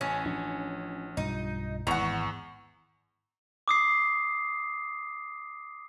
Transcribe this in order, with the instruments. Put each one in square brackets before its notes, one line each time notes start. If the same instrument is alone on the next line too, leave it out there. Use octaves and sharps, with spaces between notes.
[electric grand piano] A1 [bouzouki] C#4
[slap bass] F3 D4
[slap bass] B1 G2 F3 [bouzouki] D#4
[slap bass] G#1 [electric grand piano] E2 C#6 [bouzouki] F#5 A#5
[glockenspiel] D6 D#6 C7